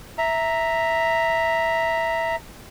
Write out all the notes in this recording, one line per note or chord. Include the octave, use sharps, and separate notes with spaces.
E5 A#5